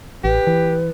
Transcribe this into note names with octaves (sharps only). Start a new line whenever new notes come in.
A1 G4 B4
E3